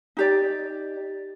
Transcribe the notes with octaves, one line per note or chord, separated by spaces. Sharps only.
D#4 G4 D5